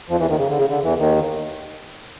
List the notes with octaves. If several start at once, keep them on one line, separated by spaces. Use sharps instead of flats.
F2 F3
E2 E3
D#2 D#3
C#3
D3
C#3
D3
E2 E3
D#2 D#3